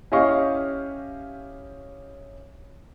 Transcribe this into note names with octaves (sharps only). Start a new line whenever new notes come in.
C#4 E4 G4 D#5 F5 C#6